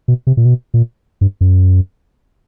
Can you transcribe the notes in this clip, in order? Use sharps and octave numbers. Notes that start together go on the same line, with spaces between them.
B2
C3
A#2
B2
A#2
G2
F#2